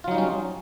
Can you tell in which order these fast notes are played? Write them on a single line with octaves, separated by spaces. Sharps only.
F4 F#3 D#4 G3 C#4